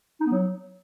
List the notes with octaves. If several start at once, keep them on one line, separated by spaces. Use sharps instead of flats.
D#4
B3
F#3